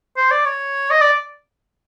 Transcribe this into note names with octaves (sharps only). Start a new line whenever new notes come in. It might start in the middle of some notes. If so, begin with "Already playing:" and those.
C5
D5
C#5
D#5
D5